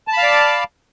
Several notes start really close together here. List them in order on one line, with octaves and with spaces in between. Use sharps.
A5 B5 F5 D5